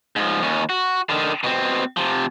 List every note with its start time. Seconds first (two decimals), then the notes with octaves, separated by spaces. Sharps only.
0.16 G#2 F3
0.43 D#2 C#4
0.70 F#4
1.09 D3 D#3
1.44 B2 C4
1.97 C3 F3